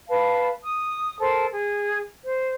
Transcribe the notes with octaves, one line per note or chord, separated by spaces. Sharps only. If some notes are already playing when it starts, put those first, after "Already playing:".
B4 F5 A5
D#6
A4 A#4 C5
G#4
C5